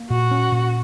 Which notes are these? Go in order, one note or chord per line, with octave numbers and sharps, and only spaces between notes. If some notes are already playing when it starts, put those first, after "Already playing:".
Already playing: A#3
A#2 F#4
C#4
A#2